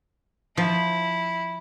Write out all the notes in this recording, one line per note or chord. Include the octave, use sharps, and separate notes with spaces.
F3 E4